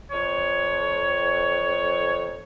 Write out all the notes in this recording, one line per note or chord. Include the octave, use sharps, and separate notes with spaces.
F2 C#5